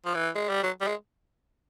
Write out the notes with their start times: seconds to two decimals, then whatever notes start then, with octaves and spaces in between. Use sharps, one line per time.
0.05 F3
0.15 E3
0.35 G#3
0.49 G3
0.63 F#3
0.81 G3
0.87 G#3